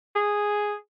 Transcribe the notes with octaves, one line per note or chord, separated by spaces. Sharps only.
G#4